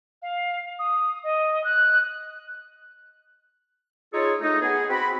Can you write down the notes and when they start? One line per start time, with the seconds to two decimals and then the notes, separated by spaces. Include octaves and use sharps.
0.22 F5
0.79 D#6
1.23 D#5
1.64 F#6
4.14 D#4 F4 G#4 A4 C#5
4.41 A3 D#4
4.61 B3 G#4
4.90 C4 F#4 B5